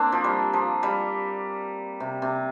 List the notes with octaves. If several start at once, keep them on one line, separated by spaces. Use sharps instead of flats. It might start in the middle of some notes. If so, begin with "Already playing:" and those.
Already playing: A#3 C4 D4
F3
G3
F3
G3
C3
C3